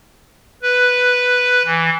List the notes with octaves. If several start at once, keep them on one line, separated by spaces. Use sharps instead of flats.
B4
E3